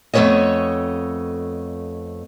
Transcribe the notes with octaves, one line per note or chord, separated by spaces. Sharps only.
F2 A3 B3 B4 C#5 D#5